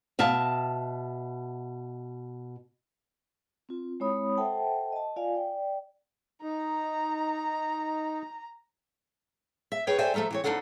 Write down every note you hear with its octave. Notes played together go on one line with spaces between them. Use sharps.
B2 E5 F5 A5
C4 F4
G#3 C4 E4 C#5 B5 D#6
A4 C5 E5 F#5 G5 A5
D#5 A5
F4 D5 F5 G#5
D5 G5
D#4 A#5
E5
G#4 B4 C#5 G5
A4 C5 D5 E5 G5 G#5
F3 A3 A4 E5 A#5
E3 C4 C#5
F2 F3 D4 D#4 A4 F#5